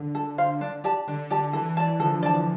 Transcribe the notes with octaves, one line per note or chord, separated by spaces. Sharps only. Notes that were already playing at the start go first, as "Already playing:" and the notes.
Already playing: D3
A4
C5 F5
D4
G4 D5 A5
D3 D4
G4 D5 A5
E3 A4
D5 A5
D3 F3 A4
D5 A5